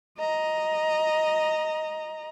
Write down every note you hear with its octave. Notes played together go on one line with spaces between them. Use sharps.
D#5 A#5